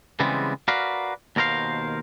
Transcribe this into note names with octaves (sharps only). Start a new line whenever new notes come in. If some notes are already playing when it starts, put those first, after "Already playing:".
C#3 E3 G3 G#3 B3 C4
F#4 A#4 B4 D5 F5
D#2 B2 A#4 C5 F5